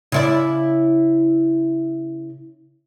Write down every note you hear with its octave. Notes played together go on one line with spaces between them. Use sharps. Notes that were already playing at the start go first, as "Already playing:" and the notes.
C#3 E4 D5